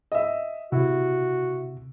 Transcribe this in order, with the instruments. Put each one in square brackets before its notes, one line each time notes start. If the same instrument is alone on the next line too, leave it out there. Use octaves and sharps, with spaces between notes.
[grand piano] D#5 E5
[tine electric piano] C3 [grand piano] E4 [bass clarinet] F#4